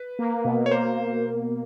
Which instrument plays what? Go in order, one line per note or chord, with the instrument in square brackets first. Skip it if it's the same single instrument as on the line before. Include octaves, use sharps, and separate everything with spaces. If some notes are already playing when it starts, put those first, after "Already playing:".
Already playing: [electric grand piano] B4
[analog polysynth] A#3
B2
[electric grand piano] C#5
[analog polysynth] A#3 [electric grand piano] C5